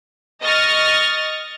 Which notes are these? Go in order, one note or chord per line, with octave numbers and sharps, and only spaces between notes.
D#5 C#6 F6 A6 A#6